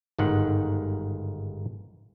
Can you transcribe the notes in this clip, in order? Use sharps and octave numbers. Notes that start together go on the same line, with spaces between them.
G1 G#2 D#3 F#5